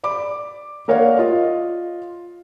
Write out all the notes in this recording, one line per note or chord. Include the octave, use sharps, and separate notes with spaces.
D5 B5 D6
A#3 A#4 C#5 D5 F5 F#5
F4 D#5